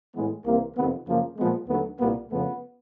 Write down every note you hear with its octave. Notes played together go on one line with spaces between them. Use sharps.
A2 E3 G#3 B3
C2 C3 E3 A#3
F2 C3 D#3 B3
F#2 C#3 F3 A#3
A#2 F3 G#3 B3
D#2 D3 F#3 A3 B3
C2 A#2 G3 A#3 B3
F2 C#3 F3 A3 B3